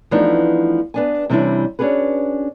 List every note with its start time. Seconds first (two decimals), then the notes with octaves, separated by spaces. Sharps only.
0.11 E3 F3 A3 B3 D4 D#4
0.94 B3 D4 G#5
1.30 C3 E3 G3 C#4 D4 E4
1.79 C#4 D4 F#4 G#4 B4